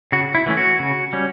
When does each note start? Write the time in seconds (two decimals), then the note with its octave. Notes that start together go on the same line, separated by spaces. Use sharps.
0.12 C#3 F#4
0.35 E4
0.46 E3 A3 C#4
0.57 F#4
0.80 C#3
1.13 G3 C#4